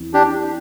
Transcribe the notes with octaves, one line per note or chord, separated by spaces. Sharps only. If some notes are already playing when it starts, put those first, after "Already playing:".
Already playing: E2 E3 C4
D4 G4